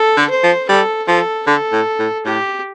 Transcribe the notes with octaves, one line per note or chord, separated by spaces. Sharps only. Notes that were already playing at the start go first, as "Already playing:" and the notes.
Already playing: A4
D3
C5
F3
G3 A4
F3 A4
D3 A4
A2
A2
A2 G4